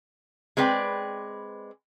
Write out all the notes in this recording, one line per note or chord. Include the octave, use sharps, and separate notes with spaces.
G#3 C4 B4 D5 G5